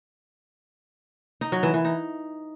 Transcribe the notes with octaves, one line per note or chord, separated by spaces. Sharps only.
D#4
F#3
E3
E3
D#4